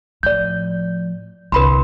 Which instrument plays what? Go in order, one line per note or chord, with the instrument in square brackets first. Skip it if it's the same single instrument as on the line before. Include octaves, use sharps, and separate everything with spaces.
[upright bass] A2 F3 [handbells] D5 G6
[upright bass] C2 D3 [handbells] B4 B5 C6